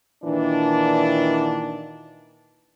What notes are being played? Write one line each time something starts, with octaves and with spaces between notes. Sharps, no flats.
A#2 D#3 E3 D4